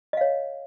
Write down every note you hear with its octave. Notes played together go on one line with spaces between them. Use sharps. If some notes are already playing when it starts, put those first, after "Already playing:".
C#5 D#5 F5